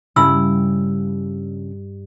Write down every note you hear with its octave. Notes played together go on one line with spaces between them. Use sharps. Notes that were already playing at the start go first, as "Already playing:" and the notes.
G2 C#3 E4 B5 E6